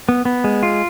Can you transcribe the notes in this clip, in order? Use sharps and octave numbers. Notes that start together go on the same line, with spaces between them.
B3
B3
G#3
F4